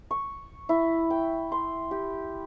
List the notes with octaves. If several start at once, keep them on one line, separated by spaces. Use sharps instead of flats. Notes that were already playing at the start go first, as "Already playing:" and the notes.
C#6
E4
G5
C6
G4